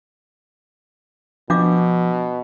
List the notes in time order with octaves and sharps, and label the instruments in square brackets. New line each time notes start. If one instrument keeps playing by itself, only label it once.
[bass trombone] B2 [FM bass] F3 [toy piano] D4 F5 D6